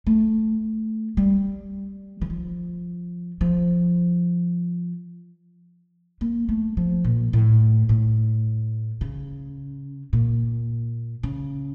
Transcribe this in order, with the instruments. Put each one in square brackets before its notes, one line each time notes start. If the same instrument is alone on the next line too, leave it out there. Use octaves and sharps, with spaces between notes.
[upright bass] A3
G3
E3
F3
F3
A#3
A3
F3
A#2
A2
A2
C#3
A#2
C#3